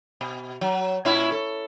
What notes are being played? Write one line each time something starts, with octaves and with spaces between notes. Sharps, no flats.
B2
F#3
A#2 C#4 E4
A4